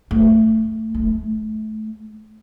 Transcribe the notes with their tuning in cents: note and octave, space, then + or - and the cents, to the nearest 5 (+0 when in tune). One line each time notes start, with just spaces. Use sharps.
A3 +10
A3 -25